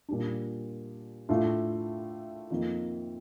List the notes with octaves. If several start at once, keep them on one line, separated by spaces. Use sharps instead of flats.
A#2 G3 D4
A2 A3 D4 F4
F2 D#3 A#3 F4